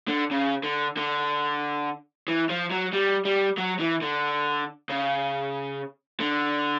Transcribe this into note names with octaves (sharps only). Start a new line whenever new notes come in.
D3
C#3
D3
D3
E3
F3
F#3
G3
G3
F#3
E3
D3
C#3
D3